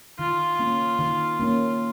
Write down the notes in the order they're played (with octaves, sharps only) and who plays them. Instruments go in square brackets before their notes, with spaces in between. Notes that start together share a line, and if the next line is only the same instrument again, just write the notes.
[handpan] D#3 [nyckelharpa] F4
[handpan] A#3 C#4
D#3
A#3 C#4